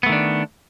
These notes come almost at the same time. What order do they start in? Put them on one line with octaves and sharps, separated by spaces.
B3 A3 D#3 D4